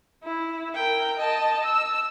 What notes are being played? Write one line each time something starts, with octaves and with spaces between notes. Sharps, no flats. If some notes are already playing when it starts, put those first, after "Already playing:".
E4
A#4 G5
D#5 A5
E6